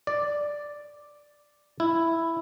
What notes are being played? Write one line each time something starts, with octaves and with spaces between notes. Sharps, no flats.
D5
E4